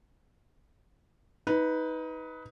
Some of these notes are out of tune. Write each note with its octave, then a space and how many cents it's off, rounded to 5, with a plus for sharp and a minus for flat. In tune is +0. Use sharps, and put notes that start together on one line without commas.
D#4 +25 B4 +0